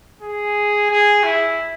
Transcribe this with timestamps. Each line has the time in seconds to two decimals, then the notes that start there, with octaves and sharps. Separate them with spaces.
0.22 G#4
0.91 G#4
1.24 E4